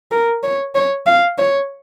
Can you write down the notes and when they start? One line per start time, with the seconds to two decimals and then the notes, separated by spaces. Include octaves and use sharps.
0.11 A#4
0.43 C#5
0.75 C#5
1.06 F5
1.38 C#5